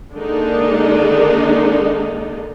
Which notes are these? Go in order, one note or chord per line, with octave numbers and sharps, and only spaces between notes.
D3 D#3 G#3 A#3 D4 D#4